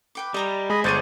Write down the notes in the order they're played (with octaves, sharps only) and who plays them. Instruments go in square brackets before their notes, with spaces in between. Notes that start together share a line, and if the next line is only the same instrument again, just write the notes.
[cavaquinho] B4 G5 D6
[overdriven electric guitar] G3 [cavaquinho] D#5 A#5 B5
[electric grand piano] G#3 [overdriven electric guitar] G#4 [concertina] D#5 B5
[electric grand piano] G1 A6 D#7 [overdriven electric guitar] G#3 [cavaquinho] A4 D5 C#6 [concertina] C5